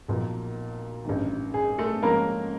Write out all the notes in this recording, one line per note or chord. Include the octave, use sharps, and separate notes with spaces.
B1 A#2 F3
A1 G2 D#3
G#4
A3 A4
G#2 F3 A#3 C#4 A#4